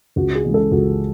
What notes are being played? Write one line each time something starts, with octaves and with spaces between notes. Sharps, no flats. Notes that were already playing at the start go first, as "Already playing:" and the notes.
C#2 F#4
G#4
C#3 E3 G#3
A4
C#2 F#4